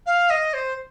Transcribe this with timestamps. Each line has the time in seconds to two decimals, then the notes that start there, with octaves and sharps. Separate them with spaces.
0.06 F5
0.30 D#5
0.53 C5